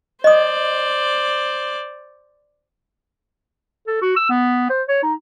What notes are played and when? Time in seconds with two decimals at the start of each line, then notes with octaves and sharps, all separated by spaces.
0.24 C5 D5 D#5 D#6
3.87 A4
4.02 F#4
4.16 E6
4.29 B3
4.69 C5
4.88 C#5
5.03 D#4